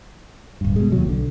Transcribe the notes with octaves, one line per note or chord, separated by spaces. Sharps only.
D1 G2
B2 G#3
D#2 F#3
B1 D3